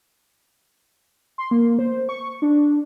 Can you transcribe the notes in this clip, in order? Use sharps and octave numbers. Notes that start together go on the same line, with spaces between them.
C6
A#3
C5
C#6
D4